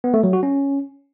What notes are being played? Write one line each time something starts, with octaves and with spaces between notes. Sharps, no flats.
B3
A3
F#3
F#4
C#4